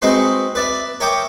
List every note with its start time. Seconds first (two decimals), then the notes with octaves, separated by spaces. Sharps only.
0.02 G#3 C4 D#4 F#4 B4 C6
0.55 B4 D5 E5
1.00 A#4 C#5 E5 G5 D6 D#6